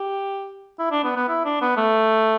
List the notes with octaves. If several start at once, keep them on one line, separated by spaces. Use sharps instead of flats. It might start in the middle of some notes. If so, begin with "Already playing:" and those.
Already playing: G4
E4
D4
B3
B3
E4
D4
B3
A3